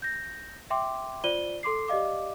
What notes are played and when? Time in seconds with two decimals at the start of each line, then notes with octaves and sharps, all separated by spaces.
0.02 G6 A#6
0.70 E5 G5 C6 D6
1.24 F4 C5 D5 D#7 G7
1.63 A4 C6 D6 C7
1.88 G4 D5 D#5 F5 D6